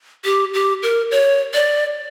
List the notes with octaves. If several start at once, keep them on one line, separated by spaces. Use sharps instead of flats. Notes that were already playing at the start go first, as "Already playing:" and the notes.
G4
G4
A#4
C#5
D5